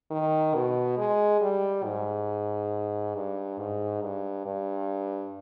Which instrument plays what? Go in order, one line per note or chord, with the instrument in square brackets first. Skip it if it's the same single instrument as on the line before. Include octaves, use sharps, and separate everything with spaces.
[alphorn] D#3
B2
G#3
G3
G#2
G2
G#2
G2
G2